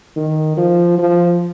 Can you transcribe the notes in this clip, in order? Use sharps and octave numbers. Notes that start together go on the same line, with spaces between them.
D#3
F3
F3